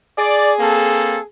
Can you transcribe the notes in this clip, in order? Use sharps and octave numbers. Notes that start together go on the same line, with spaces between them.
G#4 D5
A#3 C4 A4